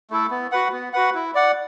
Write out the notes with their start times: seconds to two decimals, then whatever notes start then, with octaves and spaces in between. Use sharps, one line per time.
0.10 A3 E4 A4
0.30 B3
0.52 F#4 B4 F#5
0.72 B3
0.93 F#4 B4 F#5
1.14 E4
1.35 D5 F#5